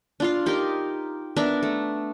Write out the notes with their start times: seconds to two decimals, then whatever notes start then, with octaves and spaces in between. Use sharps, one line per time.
0.20 D4 F4 F5
0.46 D#4 G4 A#4
1.36 B3 D4 A#4 E5
1.63 A3